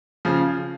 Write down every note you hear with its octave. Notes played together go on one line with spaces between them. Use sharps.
C#3 F3